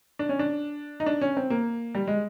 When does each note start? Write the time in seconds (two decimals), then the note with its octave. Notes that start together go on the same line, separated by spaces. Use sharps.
0.19 D4
0.29 C#4
0.39 D4
1.00 D#4
1.06 D4
1.21 C#4
1.37 C4
1.50 A#3
1.95 G3
2.07 G#3